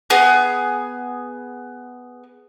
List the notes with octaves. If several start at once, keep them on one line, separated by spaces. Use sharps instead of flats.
B3 G#4